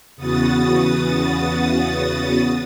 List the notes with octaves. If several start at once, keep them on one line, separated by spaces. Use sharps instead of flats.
E2 C#3 B3 F#4 D#6 A6